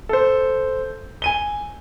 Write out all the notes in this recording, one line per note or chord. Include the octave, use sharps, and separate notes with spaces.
A4 C5
G#5 D#7 G7